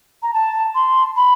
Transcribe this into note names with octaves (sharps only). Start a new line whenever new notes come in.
A#5
A5
C6
B5